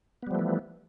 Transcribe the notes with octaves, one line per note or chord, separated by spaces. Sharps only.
E3 F3 G3 A3 B3